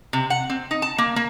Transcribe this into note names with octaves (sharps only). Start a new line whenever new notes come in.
C3
F#5
C4
D#4
A5
A#3
A#3